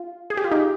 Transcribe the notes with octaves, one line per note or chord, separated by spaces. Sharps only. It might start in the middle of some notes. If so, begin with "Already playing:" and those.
Already playing: F4
G#4
G4
F4
D#4 G4